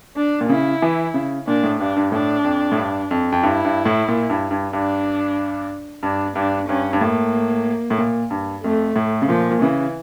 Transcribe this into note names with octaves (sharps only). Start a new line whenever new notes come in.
D4
A#2
C#3 E4
E3
C#3
A#2 D4
A2
G2 D4
G2
A2 D4
F2
A2
G2
F2
F2
G2 E4
G2
A2
A#2
G2
G2
G2 D4
G2 D4
G2 D4
G2 C#4
G2
A2 A#3
A2
A#2
G2
F2 A3
A2
C#3
A#2 F3
A#2
C#3 E3